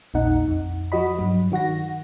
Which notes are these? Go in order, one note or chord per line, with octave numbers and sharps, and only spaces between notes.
A#1 E2 A#2 D#4 F#5
F2
F3 F#4 D#5 B5
G2 F#3
D#3 F#4 F#5 A#6